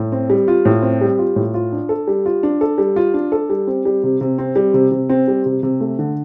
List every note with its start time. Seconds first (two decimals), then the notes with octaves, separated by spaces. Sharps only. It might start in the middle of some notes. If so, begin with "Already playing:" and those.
Already playing: A2
0.12 C4
0.30 G3
0.48 F4
0.65 A2
0.82 C4
1.01 G3
1.19 F4
1.36 A2
1.54 F4
1.72 D4
1.89 A4
2.08 G3
2.26 F4
2.43 D4
2.61 A4
2.78 G3
2.96 F4
3.14 D4
3.32 A4
3.50 G3
3.67 C4
3.85 G3
4.03 C3
4.21 C3
4.38 C4
4.56 G3
4.74 C3
4.92 C3
5.10 C4
5.28 G3
5.46 C3
5.63 C3
5.80 A3
5.99 D3